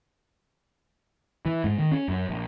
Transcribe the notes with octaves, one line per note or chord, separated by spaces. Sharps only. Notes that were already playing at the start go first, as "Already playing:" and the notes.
E3
G#2
D#3
C#4
F#2
A#1